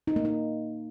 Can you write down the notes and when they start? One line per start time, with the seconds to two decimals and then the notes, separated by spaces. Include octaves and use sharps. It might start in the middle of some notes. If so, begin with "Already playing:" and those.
0.07 D#4
0.16 A#3
0.25 D#4